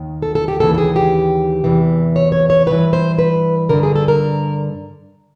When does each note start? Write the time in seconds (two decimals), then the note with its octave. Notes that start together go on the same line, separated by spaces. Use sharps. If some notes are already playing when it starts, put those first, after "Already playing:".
Already playing: D#2 D#3
0.22 A4
0.35 A4
0.48 G4
0.60 D#2 C#3 E3 A4
0.74 A4
0.78 G#4
0.96 G4
1.64 E2 C3 E3
2.16 C#5
2.32 C#5
2.50 C#5
2.67 G2 E3 B4
2.93 C5
3.19 B4
3.69 G2 D3 A#4
3.83 G#4
3.96 A4
4.08 A#4